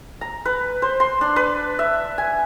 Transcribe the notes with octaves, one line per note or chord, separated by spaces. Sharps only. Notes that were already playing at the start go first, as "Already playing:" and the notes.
A#5
B4
C5
C6
D4
B4
E5
G#5